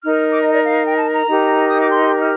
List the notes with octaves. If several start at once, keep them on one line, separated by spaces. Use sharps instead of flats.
D#4 A#4 F6
D6
D#5
D5
F5
G5
A5
A#5
D#4 G4 A#4
D#6
D6
C6
F6